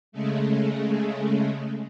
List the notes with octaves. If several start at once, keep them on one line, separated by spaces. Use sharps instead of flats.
C#3 G#3 A3